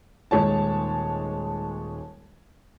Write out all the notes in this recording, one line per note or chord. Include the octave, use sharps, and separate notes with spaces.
D#1 G#3 C#5 A5